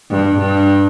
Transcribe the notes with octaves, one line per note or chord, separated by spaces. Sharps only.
G2
G2